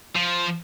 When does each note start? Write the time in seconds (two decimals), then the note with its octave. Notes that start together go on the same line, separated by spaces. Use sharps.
0.15 F3